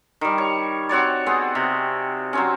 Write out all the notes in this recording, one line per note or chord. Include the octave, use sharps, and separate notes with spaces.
D#3 G3
C#5
C4 F#4 C#5 D5
B3 C4 G#4
C3
F#3 C4 C#4